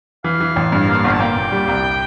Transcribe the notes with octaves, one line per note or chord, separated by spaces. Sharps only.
E3 F5
E3
A1
G2
A#3
G1
A5
A#3 G5
A#2
G3
C2